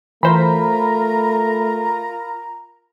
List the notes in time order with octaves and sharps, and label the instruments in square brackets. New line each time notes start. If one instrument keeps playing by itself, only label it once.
[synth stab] E3 C5 [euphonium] A3 [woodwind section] F4 A#4 A#5 [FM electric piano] B5